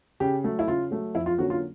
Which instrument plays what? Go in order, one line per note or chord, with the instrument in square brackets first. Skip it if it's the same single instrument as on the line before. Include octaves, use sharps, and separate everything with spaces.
[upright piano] C#3 G4
F#3 A3
E4
C#3 F4
F#3 A3
F2 E4
F4
D3 F#3 A#3 C#4 F#4
F4